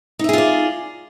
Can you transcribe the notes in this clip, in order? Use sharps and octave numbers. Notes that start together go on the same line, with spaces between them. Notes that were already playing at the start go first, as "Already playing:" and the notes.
D#4 F4 G#4 D5 E5